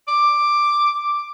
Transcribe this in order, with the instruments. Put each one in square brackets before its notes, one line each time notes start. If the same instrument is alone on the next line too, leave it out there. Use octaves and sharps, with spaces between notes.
[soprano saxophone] D6